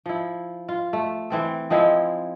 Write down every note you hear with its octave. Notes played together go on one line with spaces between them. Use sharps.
F3 E4
F4
A3
E3 C4 A4
F3 G#3 C4 E4